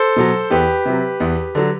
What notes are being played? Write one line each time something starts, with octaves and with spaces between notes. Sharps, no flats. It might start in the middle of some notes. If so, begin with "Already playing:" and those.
Already playing: A4 C5
B2 F#3
E2 G4 B4
C3 F#3
E2
D3 F#3